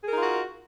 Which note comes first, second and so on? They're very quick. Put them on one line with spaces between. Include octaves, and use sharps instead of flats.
G#4 A#4 D#4 F4 F#4